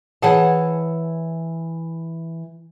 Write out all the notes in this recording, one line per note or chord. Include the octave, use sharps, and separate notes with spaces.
E3 G#4 C#5 F#5 G#5 A5